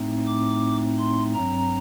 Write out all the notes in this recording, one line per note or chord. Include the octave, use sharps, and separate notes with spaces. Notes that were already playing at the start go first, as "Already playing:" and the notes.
Already playing: A2 A3 C4 D#4
D6
C6
G2 F#3 C4 A#5